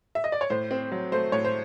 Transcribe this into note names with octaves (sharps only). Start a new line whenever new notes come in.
E5
D#5
D5
C#5
A2 C5
C4
F#3
A3 C5
A2 C#5
C5